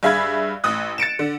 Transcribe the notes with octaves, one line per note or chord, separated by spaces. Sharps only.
G2 G#4 E5 F5 B5 G#6
A1 D#6 F#6
A6 C#7 D7 E7
D3